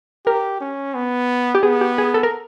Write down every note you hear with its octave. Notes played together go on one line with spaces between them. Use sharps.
G4 A#4
C#4
B3
G4
B3 G#4
G4
G#4
A4
A#4